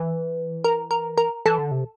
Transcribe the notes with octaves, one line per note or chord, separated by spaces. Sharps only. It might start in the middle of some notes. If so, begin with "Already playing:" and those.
Already playing: E3
A#4
A#4
A#4
E3 A4
D3
C3